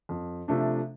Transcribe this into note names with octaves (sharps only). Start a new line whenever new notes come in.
F2
C3 F3 A3 D4